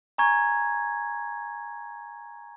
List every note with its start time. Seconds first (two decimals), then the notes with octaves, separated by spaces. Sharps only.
0.18 G#5 A#5 C#6 G#6